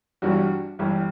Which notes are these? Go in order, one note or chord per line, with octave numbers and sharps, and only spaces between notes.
G1 G2 E3 G3 D4 F#4
G1 G2 E3 G3